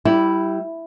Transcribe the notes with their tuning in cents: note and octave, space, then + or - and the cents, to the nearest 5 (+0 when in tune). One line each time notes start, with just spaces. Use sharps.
G3 -20 E4 +0